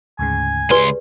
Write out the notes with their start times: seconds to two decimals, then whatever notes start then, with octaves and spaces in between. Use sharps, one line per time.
0.19 D2 G#2 C#3 G#5
0.70 C#2 G4 G#4 B4 D5 C6